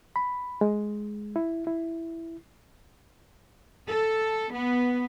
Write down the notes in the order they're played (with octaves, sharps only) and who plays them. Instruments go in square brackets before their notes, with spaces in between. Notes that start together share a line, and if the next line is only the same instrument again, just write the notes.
[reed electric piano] B5
G#3
E4
E4
[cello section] A4
B3